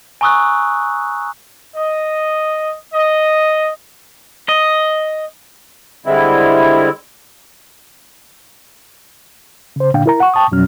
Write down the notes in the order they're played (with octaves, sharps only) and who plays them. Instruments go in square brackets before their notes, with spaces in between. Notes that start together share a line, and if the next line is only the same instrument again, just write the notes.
[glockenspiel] G#5 A#5 C#6 D#6 E6 F#6
[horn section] D#5
D#5
[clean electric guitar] D#5
[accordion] D3 G3 G#3 C4 E4
[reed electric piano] C#3 C5
A#2 D3 D4 F5 G5
E4 A#4 A#5
F#5 C#6
G5 A5 C#6 D#6
F2 B2 F#3 C#4 F6